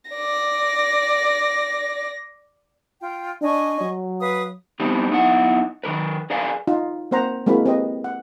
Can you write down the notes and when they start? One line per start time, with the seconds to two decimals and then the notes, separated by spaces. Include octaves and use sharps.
0.11 D5 A#6
3.01 F4 G5
3.41 D4 D#5 G#5 C#6
3.80 F#3
4.20 B4 F5 D#6
4.80 G3 B3 C4 D4 D#4 G4
5.11 B3 D#4 E4 F#5
5.84 D#3 G#3 A#4 B4
6.30 G#4 A#4 B4 D5 F5 G#5
6.67 D#4 F4
7.11 A#3 C4 C5 F#5 A#5
7.46 G#3 A#3 C4 E4 F#4 B5
7.66 C4 G4 B4 D#5
8.04 F#5